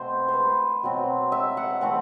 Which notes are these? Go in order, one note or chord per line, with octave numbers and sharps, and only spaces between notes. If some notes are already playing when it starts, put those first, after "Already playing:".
Already playing: B2 A3 C4 C5
B4 C5
B2 F#3 C4
E5
F#5
E3 A3 C4 F#5